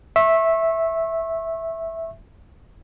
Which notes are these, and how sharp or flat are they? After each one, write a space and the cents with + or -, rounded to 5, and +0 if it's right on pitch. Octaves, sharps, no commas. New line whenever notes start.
E5 -5 C#6 -30